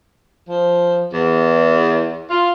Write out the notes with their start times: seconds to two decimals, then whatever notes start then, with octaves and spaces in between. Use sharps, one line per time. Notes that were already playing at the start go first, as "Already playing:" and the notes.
0.49 F3
1.12 E2
2.30 F4